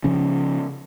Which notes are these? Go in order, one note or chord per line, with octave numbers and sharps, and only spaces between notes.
C#3 F3 C#4